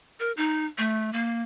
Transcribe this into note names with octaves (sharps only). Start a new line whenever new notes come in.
A#4
D#4
A3
A#3